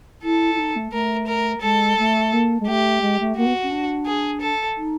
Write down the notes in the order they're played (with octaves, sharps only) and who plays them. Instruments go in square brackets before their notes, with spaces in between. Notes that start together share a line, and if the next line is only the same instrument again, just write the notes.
[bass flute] E4 [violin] A4
[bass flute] E4
D#4
A3
[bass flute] A3 [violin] A#4
[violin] A#4
[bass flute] G#3 [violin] A4
[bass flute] A3
A#3
G#3
[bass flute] A3 [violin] G4
[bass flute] G#3
A3
[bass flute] A#3 [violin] F#4
[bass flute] B3
C#4
D4
[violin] G#4
A4
[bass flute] D#4